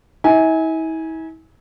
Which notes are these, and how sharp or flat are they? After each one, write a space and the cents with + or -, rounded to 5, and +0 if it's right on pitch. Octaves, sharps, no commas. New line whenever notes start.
E4 -40 G#5 +0